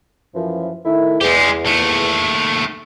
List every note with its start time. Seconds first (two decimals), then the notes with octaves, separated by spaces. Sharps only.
0.35 F#2 E3 F3
0.85 D#3 A3 E4
1.21 E2 G#3 G4
1.66 D#2 A3